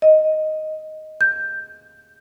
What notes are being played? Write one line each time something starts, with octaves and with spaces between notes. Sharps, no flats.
D#5
G6